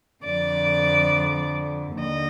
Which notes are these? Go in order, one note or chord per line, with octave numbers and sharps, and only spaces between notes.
F2 D3 F3 D5
D#2 D3 D#5